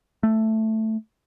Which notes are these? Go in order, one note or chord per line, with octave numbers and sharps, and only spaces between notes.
A3